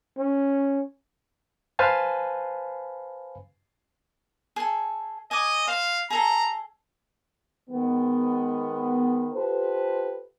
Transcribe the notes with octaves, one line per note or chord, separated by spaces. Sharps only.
C#4
B4 C5 F5 G#5 A5 B5
G#4 A4
D#5 G#5 D6
C5 F5
G#4 A4 A#5
D#3 G#3 B3
F4 G4 A4 B4 C5